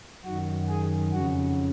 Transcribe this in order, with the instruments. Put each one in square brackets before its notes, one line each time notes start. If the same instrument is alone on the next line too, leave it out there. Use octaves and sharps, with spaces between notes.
[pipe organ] F#2 D#3 F#4
G#4
F2 C#3 F#4